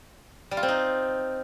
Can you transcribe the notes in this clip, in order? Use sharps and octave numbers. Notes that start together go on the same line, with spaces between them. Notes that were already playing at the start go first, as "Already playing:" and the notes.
G3
F4
C4
D#4